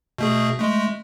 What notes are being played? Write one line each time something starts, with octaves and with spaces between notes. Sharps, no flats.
B2 A3 G#4
G#3 A3